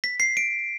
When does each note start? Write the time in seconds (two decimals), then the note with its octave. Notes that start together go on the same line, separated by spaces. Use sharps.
0.04 B6
0.20 C7
0.37 D7